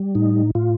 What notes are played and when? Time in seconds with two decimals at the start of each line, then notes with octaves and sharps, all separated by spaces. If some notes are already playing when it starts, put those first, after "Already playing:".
Already playing: G3
0.15 A2 D#4
0.55 A2 F4